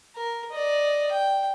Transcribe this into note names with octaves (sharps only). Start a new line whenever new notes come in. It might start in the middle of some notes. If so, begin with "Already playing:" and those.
A#4
D5 D#5
G5